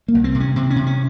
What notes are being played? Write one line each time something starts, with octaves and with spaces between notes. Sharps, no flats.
A#3
C2
C4
C3
C#4
C3 C4
C#4
C3
C#4